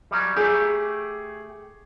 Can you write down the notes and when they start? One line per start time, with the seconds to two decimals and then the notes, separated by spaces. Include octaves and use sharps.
0.11 F#3 G3
0.36 A3 G4 G#4